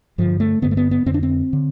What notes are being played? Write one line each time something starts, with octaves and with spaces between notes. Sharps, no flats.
G2 D3 F3
A3
G2 D3 B3
A3
B3
B3
F2 D3 C4
D4
C4
D3